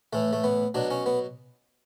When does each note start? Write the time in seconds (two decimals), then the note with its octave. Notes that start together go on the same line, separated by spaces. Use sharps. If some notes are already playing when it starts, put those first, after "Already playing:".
0.13 A2 E3 A3
0.33 A3
0.44 B3
0.74 B2 F#3 D4
0.91 C#4
1.06 B3